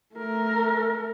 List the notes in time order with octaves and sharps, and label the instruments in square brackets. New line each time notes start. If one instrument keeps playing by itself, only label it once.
[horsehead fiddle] A3 A#4